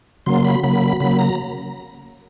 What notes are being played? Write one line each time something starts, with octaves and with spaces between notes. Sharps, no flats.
C#3 F#3 A#3 C6
B5
C#3 F#3 A#3 B5
C#3 F#3 A#3 B5
A#5